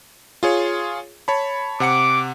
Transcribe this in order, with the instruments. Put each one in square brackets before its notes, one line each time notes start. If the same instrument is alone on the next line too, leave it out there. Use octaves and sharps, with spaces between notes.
[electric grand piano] F4 G#4 C#5
C#5 A5 B5
[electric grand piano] C3 F#5 C#7 [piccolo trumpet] D6